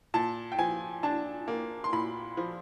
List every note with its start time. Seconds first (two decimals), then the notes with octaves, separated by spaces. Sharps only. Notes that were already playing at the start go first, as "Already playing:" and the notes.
0.14 A#2 A5
0.52 G5
0.59 F3 G#5
1.03 D4 A5
1.48 A#3
1.84 C6
1.93 A#2 B5
2.37 F3